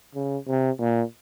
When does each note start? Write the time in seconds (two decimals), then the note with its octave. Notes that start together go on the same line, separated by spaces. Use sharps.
0.15 C#3
0.48 C3
0.80 A#2